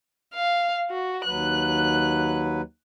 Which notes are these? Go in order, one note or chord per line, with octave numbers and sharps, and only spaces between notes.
F5
F#4
D#2 F#3 B4 F#6